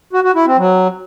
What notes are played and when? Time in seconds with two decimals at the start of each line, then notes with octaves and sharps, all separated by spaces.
0.13 F#4
0.24 F#4
0.35 E4
0.46 C4
0.57 F#3